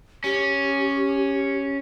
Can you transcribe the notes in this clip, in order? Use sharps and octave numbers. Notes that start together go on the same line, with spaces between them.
C#4 G4